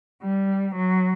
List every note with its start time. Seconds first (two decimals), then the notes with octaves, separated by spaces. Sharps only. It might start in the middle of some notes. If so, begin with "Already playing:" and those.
0.22 G3
0.75 F#3